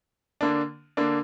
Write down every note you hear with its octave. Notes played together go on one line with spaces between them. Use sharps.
D3 A#3 D4
D3 A#3 D4